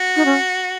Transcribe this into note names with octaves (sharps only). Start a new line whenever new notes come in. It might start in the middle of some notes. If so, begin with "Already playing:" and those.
Already playing: F#4
D#4
C#4